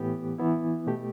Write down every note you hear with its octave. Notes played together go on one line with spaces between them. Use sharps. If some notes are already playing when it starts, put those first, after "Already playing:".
Already playing: A2 E3 B3 G4
E3 B3 E4
B2 A3 G4